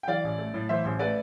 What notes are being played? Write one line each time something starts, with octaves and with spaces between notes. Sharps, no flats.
G5
E3 D5 F5
A1
A3
A2
E3 C5 E5
A1 C5
A3 B4 D5